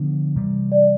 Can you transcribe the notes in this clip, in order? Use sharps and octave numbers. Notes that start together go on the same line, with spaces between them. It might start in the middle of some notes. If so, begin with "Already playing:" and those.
Already playing: D3 F3 B3 D4
C3 E3 G3
D5